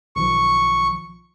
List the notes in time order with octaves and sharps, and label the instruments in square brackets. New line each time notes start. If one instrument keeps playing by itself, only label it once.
[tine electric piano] B1 D#3 F3 [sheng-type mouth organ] C#6